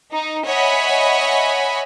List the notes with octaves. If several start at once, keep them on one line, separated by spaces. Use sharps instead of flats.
D#4
C#5 D#5 E5 F#5 G#5 B5